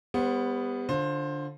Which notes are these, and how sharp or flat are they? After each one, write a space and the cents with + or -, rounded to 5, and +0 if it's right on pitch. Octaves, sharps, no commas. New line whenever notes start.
G3 +35 B3 +5 C5 +35
D3 +0 F4 +0 C5 +20